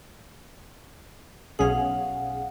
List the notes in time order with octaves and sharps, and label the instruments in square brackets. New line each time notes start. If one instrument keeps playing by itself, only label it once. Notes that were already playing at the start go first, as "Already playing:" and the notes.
[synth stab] B1 C#4 G#4 [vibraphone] F5 F#5